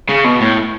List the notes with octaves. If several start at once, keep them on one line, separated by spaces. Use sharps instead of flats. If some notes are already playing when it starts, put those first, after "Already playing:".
C#3
B2
A2